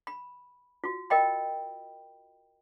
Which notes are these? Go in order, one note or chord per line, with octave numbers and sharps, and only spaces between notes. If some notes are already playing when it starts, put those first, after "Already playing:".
B5
F4 F#4
A#4 D#5 G5 B5